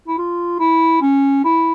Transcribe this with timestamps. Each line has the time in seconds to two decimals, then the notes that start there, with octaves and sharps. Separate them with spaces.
0.08 E4
0.18 F4
0.60 E4
1.02 C#4
1.44 E4